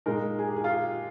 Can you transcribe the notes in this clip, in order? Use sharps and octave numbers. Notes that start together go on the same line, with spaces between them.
A#2 G#3 D#4 A#4
G#4
G4
G#4
F4
G4